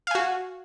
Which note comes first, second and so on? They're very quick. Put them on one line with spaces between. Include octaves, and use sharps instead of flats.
F5 G#5 F#4